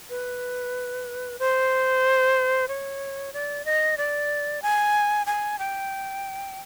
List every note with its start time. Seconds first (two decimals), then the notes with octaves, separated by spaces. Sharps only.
0.10 B4
1.39 C5
2.68 C#5
3.33 D5
3.65 D#5
3.98 D5
4.62 G#5
5.26 G#5
5.59 G5